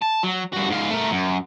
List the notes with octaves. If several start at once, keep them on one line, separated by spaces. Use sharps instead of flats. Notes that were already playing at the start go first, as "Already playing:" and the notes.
A5
F#3
G2 F#4
G#2 F5
A3 A#4
F#2